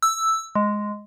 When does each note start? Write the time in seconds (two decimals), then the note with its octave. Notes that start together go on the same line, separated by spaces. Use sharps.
0.03 E6
0.55 G#3